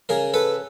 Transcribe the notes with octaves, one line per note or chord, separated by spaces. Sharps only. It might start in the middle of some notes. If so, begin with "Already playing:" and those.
C#3 G#4 A#4
A4 B4